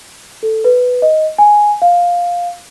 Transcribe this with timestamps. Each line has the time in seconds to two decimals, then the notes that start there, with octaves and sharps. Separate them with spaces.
0.43 A4
0.64 B4
1.02 D#5
1.38 G#5
1.82 F5